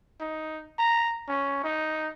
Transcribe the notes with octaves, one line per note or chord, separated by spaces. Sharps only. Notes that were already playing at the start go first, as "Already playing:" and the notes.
D#4
A#5
C#4
D#4